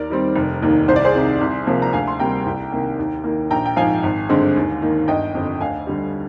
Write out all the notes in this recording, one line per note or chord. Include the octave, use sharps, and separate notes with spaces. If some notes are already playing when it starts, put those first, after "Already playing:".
Already playing: D#2 A#4 D5
D#3 G3 C4
F1
D#2 D#3 A#3
C2 C5
D5
G#4 C5
C3 D#3
C2
C3 F3 A#3
A#5
D2 F5 G#5
C6
C3 G3 A#3 G5 A#5
C2
C3 D#3 A#3
D#2
D#3 A#3
A#1 G5 A#5
G5
G#2 F3 F5 G#5
G#1
G2 D3 G#3 C4
D#2
D#3 A#3
G1 D#5 G5
F2 D3
D2 F5 G#5
D3 G3